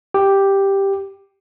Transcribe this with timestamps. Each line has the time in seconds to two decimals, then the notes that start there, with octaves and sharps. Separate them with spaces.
0.14 G4